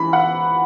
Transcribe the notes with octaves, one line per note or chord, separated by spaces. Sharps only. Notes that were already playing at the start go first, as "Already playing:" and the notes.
Already playing: E3 B5
F#5